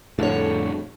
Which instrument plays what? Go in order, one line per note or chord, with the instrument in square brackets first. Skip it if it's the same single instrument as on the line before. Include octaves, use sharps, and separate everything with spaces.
[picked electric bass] F2 A2 [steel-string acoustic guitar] D3 C#5